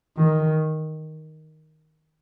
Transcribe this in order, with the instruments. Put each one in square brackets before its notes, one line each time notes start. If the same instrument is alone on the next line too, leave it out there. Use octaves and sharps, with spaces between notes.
[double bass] D#3